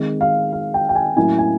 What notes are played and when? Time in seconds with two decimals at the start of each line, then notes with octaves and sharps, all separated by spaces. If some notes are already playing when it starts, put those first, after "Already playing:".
Already playing: D#3 G#3 C4 D#4
0.21 F5
0.53 F5
0.74 G5
0.89 G5
0.95 G#5
1.17 A2 F#3 A#3 C#4 E4 G#5
1.39 G#5